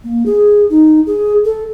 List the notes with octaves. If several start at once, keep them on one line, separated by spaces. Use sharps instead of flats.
A#3
G#4
D#4
G#4
A4